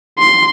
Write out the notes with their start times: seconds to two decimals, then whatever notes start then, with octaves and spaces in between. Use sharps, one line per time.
0.18 C6